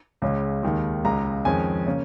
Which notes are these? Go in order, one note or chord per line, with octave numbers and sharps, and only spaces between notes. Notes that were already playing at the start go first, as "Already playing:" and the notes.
C#2 C#3 G#3 C#4
D#2 D#3 G#3
C#2 C#3 G#3 A#5
F2 D#3 G#3 C#4 G#5
C#3 A#3 C#4